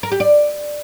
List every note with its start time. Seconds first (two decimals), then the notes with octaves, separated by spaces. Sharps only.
0.03 A#4
0.12 G4
0.20 D5